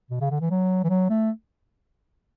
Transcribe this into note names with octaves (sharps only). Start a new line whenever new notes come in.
B2
C#3
D3
E3
F#3
E3
F#3
A3